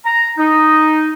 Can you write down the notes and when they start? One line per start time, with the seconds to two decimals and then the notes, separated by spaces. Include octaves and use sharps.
0.05 A#5
0.38 D#4